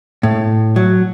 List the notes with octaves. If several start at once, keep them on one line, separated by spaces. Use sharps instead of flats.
A2
F#3